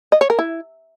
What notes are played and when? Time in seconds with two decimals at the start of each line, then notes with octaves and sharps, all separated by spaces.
0.12 D#5
0.21 C#5
0.30 A#4
0.39 E4